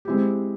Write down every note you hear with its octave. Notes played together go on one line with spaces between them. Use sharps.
G#3 C4 E4 G4